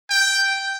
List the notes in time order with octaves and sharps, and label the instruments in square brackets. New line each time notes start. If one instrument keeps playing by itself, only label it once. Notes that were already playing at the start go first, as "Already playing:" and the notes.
[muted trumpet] G5